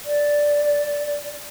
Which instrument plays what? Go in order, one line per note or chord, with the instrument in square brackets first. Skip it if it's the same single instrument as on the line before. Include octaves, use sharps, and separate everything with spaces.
[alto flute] D5